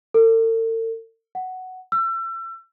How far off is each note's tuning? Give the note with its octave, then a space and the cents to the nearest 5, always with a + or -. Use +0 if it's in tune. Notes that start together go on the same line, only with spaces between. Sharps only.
A4 +45
F#5 +5
E6 +35